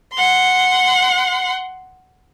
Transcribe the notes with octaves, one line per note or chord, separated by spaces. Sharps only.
F#5 C6